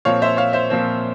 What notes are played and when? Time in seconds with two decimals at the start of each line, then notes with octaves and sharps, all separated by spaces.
0.05 A#2 F3 C4 C#5 F5
0.22 C5 E5
0.37 C#5 F5
0.53 C5 E5
0.70 A#2 F3 C4